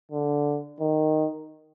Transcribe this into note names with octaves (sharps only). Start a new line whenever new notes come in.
D3
D#3